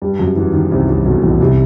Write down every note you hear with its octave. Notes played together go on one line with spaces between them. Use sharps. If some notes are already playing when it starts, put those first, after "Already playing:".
G2 G3
F#2 F#3
E2 E3
D#2 D#3
C2 C3
C2 C3
B1 B2
A1 A2
C2 C3